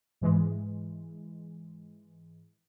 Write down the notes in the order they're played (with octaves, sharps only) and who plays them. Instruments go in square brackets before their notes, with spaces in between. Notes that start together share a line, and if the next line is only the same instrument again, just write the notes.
[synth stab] G#2 E3 G#3